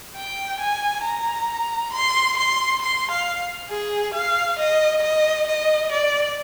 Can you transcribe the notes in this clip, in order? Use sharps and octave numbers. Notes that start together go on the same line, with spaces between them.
G5
G#5
A#5
C6
C6
C6
F5
G#4
F5
D#5
D#5
D#5
D5